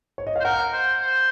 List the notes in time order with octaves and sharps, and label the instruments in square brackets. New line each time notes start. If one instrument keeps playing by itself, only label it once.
[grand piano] C#5
D#5
F5
[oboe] C5
[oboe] A#4 [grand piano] F#5
[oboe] C5
C5